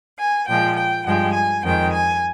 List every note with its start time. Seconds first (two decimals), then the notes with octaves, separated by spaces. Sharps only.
0.18 G#5
0.47 A#2 F3 G#3 G5
0.77 G5
1.06 G2 F3 G#3 G5
1.34 G#5
1.63 F2 D#3 G#3 G5
1.92 G#5